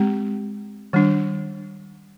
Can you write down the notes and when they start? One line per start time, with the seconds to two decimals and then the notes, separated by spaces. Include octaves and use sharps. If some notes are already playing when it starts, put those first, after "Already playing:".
Already playing: G#3 C4 G4
0.93 D#3 G3 D4